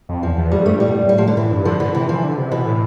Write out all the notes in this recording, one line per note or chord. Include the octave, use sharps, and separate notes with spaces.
F2
E2 F3
E2
F2 G3
G2 A3
A2 G3
B2
A2
G3
F3
D3
A2 E3
G2
D3 F3
D3 E3
C3 E3
E3 F3
D3
C3
B2 E3
A2